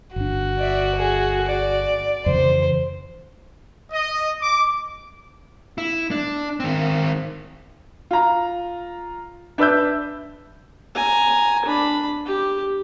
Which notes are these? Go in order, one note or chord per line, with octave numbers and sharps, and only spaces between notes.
G1 D4 F#4
D5 E5
G#4
D5
F2 C#3 E3 C5
D#5
D6
E4
D4
D#3 C4
F4 A#5
D4 B4 E5 E6 G6
G#5 A#5
D4 B5
G4